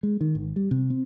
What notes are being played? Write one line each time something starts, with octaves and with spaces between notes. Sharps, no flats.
G#3
D#3
G#1
G3
C3
C4